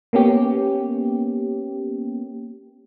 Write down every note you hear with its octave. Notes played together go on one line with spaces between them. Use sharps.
A#3 B3 C#4 G4